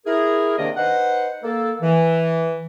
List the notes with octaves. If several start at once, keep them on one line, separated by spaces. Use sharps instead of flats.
E4 G#4 A#4
C3 D#3 A#3 D4 D5 D#5
D#4 B4 C5 F#5
A#3 A4
E3